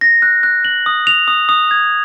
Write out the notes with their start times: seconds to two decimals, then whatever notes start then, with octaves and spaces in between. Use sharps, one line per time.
0.01 A#6
0.22 F#6
0.43 F#6
0.65 F#7
0.86 D#6
1.07 F7
1.28 D#6
1.49 D#6
1.71 G#6